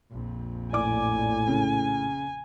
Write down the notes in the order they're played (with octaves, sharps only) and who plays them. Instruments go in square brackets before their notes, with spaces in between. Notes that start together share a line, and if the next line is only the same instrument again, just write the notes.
[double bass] A#1 F2
[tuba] A2 [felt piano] D5 D6 [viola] G#5
[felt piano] C#3